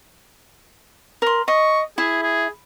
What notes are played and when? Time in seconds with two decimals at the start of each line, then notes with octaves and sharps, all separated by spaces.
1.22 A#4 C6
1.48 D#5 C#6
1.98 E4 G#4
2.23 G#4